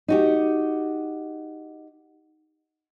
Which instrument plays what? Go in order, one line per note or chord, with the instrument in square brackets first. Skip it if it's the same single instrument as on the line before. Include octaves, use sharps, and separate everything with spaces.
[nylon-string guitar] D#4 F#4 G4